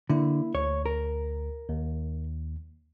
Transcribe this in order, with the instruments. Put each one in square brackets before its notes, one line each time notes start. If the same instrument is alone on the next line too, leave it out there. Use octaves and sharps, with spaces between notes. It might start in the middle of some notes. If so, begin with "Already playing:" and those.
[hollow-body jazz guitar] D3 [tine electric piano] A#3 E4
[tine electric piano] D2 [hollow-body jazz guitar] C#5
[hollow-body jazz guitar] A#4
[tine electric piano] D#2